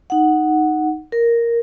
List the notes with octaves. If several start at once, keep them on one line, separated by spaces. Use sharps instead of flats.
D#4 F#5
A#4